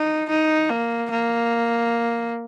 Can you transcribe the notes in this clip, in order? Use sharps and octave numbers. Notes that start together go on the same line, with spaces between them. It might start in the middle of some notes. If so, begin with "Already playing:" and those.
Already playing: D#4
D#4
A#3
A#3